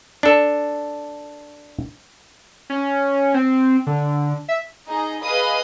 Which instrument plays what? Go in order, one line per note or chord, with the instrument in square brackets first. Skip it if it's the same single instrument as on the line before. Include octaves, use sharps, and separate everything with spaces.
[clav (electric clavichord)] D4 A4
[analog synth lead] C#4
C4
D3
E5
[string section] D#4 G#4 D#5 A#5
G#4 B4 D#5 F5 B5 D#6